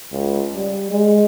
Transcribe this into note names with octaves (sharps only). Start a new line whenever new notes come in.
C#2
G3
G#3